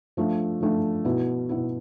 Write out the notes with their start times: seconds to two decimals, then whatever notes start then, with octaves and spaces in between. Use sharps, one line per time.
0.17 F3 A3 D4
0.61 F3 A3 D4
1.05 B2 B3 E4
1.49 B2 B3 E4